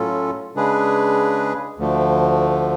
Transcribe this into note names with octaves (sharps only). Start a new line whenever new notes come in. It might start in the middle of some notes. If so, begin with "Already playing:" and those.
Already playing: A2 F#3 C#4 F4 A4
C#3 G#3 D4 G#4 B4
D2 D3 F3 A3